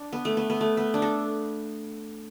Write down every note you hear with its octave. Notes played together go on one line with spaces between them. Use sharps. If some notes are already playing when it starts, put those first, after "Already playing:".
Already playing: D4
B3
A3
B3
B3
A3
B3
D4
A4